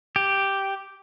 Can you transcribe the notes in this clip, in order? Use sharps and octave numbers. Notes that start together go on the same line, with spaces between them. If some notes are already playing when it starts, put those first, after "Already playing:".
G4